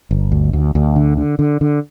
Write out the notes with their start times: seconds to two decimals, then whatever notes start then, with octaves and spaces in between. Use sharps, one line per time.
0.11 G1
0.32 D2
0.53 D2
0.75 D2
0.96 D3
1.17 D3
1.39 D3
1.61 D3